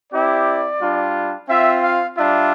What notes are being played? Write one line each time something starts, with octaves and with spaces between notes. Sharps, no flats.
C4 E4 G4 D5
G3 D4 F4
C4 F4 E5
F5
G3 D4 F4 E5